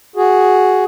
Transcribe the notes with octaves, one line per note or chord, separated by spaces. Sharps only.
F#4 G#4